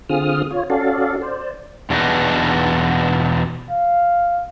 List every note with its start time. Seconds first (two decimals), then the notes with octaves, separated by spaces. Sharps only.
0.09 D3 C4 F4 G#4 D#6 F6
0.51 F4 C#5
0.70 C#4 F#4 A4 D5 F5
1.22 C5 D5
1.90 E2 B2 D4 D#4 B4
3.70 F5